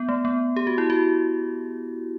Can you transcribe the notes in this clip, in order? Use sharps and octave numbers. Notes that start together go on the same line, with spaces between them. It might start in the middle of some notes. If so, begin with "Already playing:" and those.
Already playing: B3
A3
B3
G4
F#4
E4
F#4